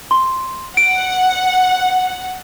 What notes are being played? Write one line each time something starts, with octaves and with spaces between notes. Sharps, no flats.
C6
F#5 D7